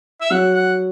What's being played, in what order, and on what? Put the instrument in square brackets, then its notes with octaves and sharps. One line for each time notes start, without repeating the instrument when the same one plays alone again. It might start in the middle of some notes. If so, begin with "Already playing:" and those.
[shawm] E5
[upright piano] F#3 [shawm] F#5
[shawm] F#5